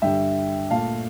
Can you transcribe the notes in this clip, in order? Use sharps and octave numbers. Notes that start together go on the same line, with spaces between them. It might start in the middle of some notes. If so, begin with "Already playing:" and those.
G2 D3 G3 E5 G5
A#2 A3 F5 A5